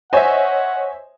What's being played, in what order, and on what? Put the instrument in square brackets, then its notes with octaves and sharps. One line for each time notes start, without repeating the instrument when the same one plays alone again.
[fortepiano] C5 E5 [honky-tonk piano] C#5 D#5 G#5 [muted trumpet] F#5